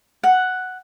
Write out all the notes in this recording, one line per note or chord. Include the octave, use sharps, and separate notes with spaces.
F#5